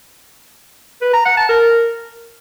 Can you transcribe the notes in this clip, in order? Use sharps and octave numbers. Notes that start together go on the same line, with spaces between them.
B4
A#5
F#5
A5
A#4